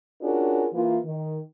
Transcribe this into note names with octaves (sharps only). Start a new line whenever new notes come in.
C#4 D4 F4 F#4 G#4 A#4
E3 A#3 F4
D#3